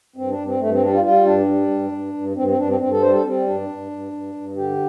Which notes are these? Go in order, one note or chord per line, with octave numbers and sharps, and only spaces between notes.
G2 C4
D4
G2
C4
G2 A3
C4
G3 D4
F4
G3 F4
G2 D4
G3
G2
G2
G2
G2 C4
C4
G2 D4
C4
G2 C4
A4
G3 C5
A4
G3 C4
G2 D4
G2
G2
G2
G2
D3 G4